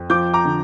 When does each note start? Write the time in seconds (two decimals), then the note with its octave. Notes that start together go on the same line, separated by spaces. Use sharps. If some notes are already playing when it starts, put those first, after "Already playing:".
Already playing: F2
0.10 F3 D6 G6
0.34 A#5 D6
0.45 D3